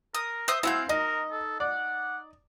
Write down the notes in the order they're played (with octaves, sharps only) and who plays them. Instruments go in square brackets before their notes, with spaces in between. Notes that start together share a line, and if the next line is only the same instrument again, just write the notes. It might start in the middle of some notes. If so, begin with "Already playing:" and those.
[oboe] A#4 [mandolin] D#6
[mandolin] C5 E5 D#6
[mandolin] C4 F5 G6 [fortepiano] E4 F#5 [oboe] G#5
[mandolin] D#4 [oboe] A#4 [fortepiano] D#5
[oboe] A4
[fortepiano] D5 [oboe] F#5